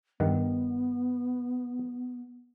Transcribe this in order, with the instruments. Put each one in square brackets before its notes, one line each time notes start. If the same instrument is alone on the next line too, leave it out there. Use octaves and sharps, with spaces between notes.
[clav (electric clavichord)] G2 D#3 F#5 [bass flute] B3